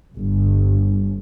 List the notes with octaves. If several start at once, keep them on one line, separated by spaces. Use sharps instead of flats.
G1